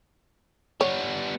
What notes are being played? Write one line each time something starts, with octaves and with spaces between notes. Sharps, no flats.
G3 B3 C#5